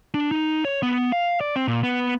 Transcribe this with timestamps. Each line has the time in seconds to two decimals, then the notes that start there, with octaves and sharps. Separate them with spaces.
0.14 D4
0.31 D#4
0.65 C#5
0.83 B3
1.12 F5
1.41 D5
1.56 C4
1.68 A#2
1.83 B3